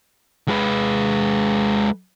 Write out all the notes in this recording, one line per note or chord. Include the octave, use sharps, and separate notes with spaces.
G#3 B4